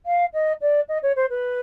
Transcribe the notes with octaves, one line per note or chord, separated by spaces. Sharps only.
F5
D#5
D5
D#5
C#5
C5
B4